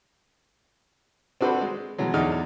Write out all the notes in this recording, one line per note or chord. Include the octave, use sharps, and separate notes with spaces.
C4 D4 F#4 A4 B4 C5
G#3
B2 E3 F#3 G#3
E2 D3 D4 D#4 F#4 F6